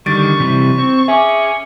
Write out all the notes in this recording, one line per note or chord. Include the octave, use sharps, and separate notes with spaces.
D3 D#3 G3 C#6 A6 D7
C3 E3 G3
C4
C#4 G#4 E5 D6
C#7